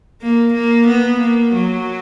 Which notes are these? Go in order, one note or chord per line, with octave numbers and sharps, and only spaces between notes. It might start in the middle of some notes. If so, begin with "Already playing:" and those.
A#3
A#3
B3
A#3
F#3